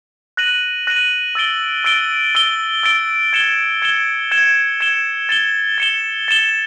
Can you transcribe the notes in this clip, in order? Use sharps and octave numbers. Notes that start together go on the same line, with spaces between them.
F#6 A#6 D#7 F#7
F#6 A#6 D#7 F#7
E6 A6 D7 G7
E6 A6 D7 G7
E6 A6 D7 G7
E6 A6 D7 G7
G#6 C#7 E7 G7
G#6 C#7 E7 G7
G#6 C#7 E7 G7
G#6 C#7 E7 G7
A6 C#7 E7 G7
A6 C#7 E7 G7
A6 C#7 E7 G7